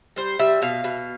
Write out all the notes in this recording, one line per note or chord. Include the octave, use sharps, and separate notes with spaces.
G3 C5
G3 E5
B2 F5
B2